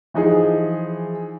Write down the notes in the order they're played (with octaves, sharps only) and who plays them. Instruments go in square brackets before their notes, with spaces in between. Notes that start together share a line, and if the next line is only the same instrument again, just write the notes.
[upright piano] E3 F3 D#4 G#4